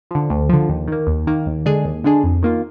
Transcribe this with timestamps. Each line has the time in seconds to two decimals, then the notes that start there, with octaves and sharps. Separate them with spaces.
0.11 D3 F3
0.30 D2
0.49 D3 F3
0.69 D#2
0.88 D#3 A#3
1.07 D#2
1.27 D#3 A#3
1.46 D#2
1.66 D3 G#3 D4 G#4
1.85 D#2
2.04 D3 G#3 D4 G#4
2.24 F2
2.42 D#3 A#3 F4